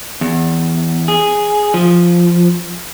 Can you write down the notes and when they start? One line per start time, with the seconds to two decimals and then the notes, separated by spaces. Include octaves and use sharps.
0.21 E2
1.08 G#4
1.74 F3